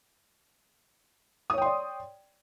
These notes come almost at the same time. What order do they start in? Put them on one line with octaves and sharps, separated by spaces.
D#6 C#5 G5 C6 D5